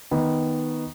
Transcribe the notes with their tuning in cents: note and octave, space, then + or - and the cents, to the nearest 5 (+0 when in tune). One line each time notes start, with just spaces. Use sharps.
D#3 +10 B3 +0